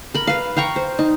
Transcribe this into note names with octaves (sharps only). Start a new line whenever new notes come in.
A#4 B5
B4 F5
F5 G5 A#5 C#6
C5
D#4